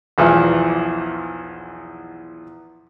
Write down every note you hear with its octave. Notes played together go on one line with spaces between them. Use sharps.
B1 E2 E3 F3